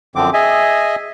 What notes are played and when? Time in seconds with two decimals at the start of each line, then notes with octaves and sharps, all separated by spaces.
0.16 F#2 D3 F3 C4 D6
0.34 G#4 D#5 E5 G#5